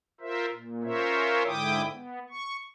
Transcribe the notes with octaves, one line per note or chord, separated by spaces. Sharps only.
F4 A#4 C5 E5
A#2
C#4 F4 A#4 C5 C#5 E5
G#2 D3 E4 G5 D6 D#6
B3
C#6